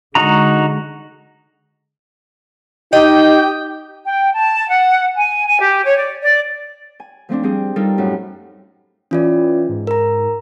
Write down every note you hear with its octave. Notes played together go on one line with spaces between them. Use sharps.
D3 G#3 D#4 F#4 A#5
D#4 G4 D#5 G5
G5
A5
F#5
G#5
G#5
G4
C#5
D5
D5
G#5
F3 A3 C4 D4
G3 C4 G#4
G3 D#4 F4 A4 A#4
F#2 A2 F#4
E3 C#4 F4 D5
G#2
A#4 A#5